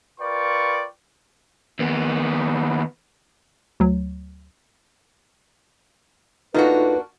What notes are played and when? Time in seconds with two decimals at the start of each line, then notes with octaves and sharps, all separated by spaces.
0.20 F4 A#4 B4 D5 G5 C#6
1.79 D#2 B3
3.80 D2 F#3
6.54 A#3 D4 D#4 F4 F#4 A4 B4